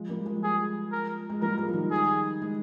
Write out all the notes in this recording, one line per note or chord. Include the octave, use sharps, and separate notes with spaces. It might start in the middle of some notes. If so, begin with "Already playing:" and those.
Already playing: F3 G#3
G3 A#3
F3 G#3
G#4
A#4
G#3
G3 A#3 A#4
F3 G#3
F3
D#3 G3
G#4
G#3